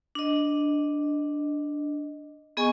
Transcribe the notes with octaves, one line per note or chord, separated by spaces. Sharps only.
D4 D#5
B3 G#4 D#5 G#5 C#6